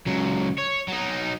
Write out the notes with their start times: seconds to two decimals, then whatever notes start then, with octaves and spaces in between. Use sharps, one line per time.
0.06 C#2 F#3
0.58 C#5
0.88 F#3 D#4